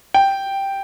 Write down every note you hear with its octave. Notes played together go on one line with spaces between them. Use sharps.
G5